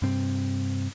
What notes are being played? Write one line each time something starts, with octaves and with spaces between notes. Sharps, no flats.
G2 C3 C4